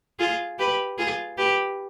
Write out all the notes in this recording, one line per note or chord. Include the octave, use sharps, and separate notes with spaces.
F4 G#4
G4 B4
F4 G#4
G4 B4